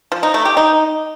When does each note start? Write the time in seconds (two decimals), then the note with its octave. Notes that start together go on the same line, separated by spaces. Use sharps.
0.12 F3
0.23 D#4
0.34 A3
0.45 G4
0.57 D#4